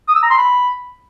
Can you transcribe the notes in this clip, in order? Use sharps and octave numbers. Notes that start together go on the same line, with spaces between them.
D#6
E6
A#5
C6
B5